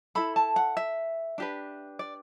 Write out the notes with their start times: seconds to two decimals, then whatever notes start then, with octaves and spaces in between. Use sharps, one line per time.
0.15 E4 A4 B5
0.36 A5
0.56 F#5
0.77 E5
1.38 D4 G4 B4
1.99 D5